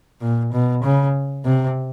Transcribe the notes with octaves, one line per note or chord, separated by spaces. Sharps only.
A#2
B2
C#3
C3